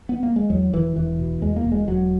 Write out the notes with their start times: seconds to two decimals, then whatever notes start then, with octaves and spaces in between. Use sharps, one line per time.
0.09 B3
0.23 A#3
0.36 G#3
0.50 E2 F#3
0.73 E1 E3
0.96 E1 E3
1.19 B2
1.42 E2 G#3
1.56 A#3
1.64 E1
1.72 G#3
1.87 E1 F#3